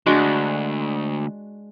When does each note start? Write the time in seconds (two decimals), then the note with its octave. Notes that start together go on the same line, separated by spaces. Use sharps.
0.06 D2 G#3 D4 F#4